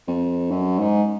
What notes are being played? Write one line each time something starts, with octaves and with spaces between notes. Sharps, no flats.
F2
F#2
G#2